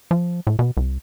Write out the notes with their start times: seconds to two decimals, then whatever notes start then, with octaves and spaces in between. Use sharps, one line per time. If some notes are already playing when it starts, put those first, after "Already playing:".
0.11 F3
0.47 A2
0.59 B2
0.77 C2